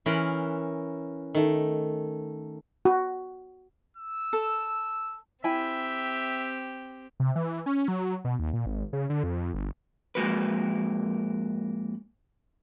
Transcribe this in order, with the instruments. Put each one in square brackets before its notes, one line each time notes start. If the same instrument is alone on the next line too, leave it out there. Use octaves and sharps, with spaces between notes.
[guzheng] E3 C#4 A#4 B4 B5 C6
D#3 A3
[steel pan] F#4
[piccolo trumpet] E6
[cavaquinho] A4
[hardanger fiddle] C4 G4 [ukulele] E4 G5 G#5 [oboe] E5
[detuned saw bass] C3
E3
C#4
F#3
B2
D#2
A#2
G#1
C#3
D3
F2
G1
[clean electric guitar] F2 G#3 A#3 F#4 A#4 B4